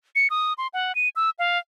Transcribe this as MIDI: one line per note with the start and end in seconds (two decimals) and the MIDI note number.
0.15 0.28 97
0.30 0.53 87
0.58 0.67 84
0.74 0.95 78
0.95 1.09 99
1.16 1.30 88
1.39 1.58 77